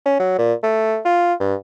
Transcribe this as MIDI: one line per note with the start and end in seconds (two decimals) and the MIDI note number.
0.05 0.16 61
0.19 0.34 54
0.38 0.53 46
0.63 1.00 57
1.05 1.34 65
1.40 1.55 43